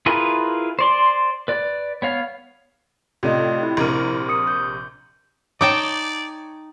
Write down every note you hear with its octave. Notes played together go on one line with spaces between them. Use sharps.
E4 F4 G#4 A#4 B4
C5 D5 C6
B4 D5
B3 C#5 F5
A2 C3 F4 D5 D#5
E4
A#1 C3 A#4
D#6 C#7
G6
D#4 C#5 D5 G5 A5 D6